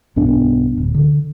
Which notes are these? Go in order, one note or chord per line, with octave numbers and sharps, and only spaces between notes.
B1 G2 B3 D4
D1
D3